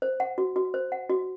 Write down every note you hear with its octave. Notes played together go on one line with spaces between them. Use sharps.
C5
F#5
F#4
F#4
C5
F#5
F#4